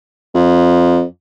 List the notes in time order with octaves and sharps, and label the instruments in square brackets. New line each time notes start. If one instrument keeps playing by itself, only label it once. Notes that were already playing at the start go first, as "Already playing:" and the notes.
[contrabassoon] F2